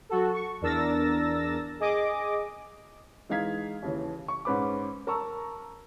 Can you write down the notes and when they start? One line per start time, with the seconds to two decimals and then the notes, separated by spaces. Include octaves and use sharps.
0.09 F#3 F#4 A4
0.34 C#6
0.61 E2 D4 A#4 E6 A6 A#6
1.80 G#4 D#5 D6
3.29 E3 G#3 D#4 F5 G#6 B6
3.82 D#2 C#3 E3
4.28 C#6
4.45 G#2 C#4 B4 B5 D6
5.07 A#4 A5 A#5 C#6 E6